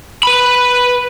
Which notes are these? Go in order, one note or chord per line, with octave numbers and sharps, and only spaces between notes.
B4 B5